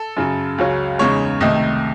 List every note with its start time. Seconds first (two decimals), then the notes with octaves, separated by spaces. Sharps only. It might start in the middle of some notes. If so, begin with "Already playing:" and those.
Already playing: A4
0.17 F#2 C#3 F#3
0.58 C#2 C#3 F#3 C#4
0.99 E2 C#3 G#3 D#4 C#5
1.41 C2 C3 D#3 A3 D#5